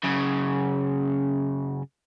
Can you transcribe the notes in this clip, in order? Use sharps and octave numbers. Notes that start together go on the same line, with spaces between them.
F#2 C#3